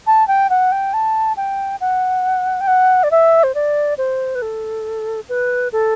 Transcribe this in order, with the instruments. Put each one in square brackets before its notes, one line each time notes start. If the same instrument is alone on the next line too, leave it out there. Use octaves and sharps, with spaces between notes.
[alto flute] A5
G5
F#5
G5
A5
G5
F#5
G5
F#5
D5
E5
C5
D5
C5
B4
A4
B4
A4